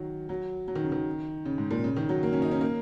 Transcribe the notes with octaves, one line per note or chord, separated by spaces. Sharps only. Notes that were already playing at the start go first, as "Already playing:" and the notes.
Already playing: D#3 F#3
F#3
F#3
D#3
C#3
D#3
C#3
G#2
A#2
C#3
D#3
F#3
A#3
C#4
D#4
C#4
A#3